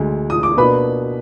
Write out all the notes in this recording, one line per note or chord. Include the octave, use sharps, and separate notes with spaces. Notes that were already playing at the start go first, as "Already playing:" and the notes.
Already playing: D2 D3 G#3
D#6
D6
B2 A#3 D4 B4 B5